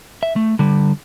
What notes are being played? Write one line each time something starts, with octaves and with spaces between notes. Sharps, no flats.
E5
A3
D3 G3